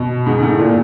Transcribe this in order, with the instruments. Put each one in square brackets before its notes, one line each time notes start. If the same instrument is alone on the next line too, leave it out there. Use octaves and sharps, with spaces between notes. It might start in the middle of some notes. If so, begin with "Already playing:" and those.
Already playing: [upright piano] B2
G#2
G#2
A2
A#2